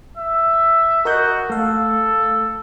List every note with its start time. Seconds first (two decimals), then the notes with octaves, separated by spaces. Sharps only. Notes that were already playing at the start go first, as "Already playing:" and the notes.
0.17 E5
1.05 F#4 A#4 D#5 G6
1.50 A3 A4 F5